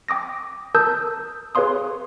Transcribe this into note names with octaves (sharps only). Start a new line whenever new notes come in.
G5 D6 D#6 A#6
A#4 A5 D#6 E6 G6
G#4 B4 C#5 F5 C6 D#6